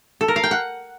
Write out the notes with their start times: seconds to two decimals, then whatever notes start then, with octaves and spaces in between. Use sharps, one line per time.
0.21 A4
0.28 A#4
0.36 F5
0.44 G5
0.51 F#5